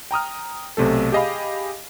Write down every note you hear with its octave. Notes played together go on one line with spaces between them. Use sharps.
G5 A#5 D#6 F6
B1 C3 A3 A4
G4 G#4 D#5 F5 B5